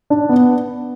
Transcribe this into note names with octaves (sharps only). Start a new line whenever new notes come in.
D4
B3